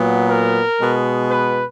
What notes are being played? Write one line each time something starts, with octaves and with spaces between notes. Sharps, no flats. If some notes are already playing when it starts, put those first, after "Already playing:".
Already playing: A#2 F#3 B3
A#4
B2 G#3 B3
B4